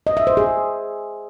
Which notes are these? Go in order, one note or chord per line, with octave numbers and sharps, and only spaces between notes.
D#5
E5
C5
G#4